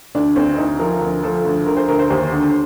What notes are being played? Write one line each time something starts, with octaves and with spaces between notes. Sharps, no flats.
D2 D4
D2 C4
D2 D#4
F3 A#4
D2
F3 A4
D2
D3 A#4
C5
D2 A#4
C5
D#2 C5
D3